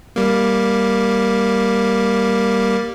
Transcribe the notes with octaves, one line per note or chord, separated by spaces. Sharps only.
G3 A#3